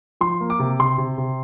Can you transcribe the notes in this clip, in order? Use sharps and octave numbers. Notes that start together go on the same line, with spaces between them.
F3 C6
A#3
D6
C3
C3 C6
C3
C3